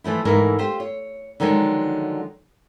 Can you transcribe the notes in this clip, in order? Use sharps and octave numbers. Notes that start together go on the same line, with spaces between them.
E3 F3 A3 E4
G#2 E3 E4 A4 A#4 G#5
F4 G4 C5
C#5
D3 D#3 F3 F#3 G#3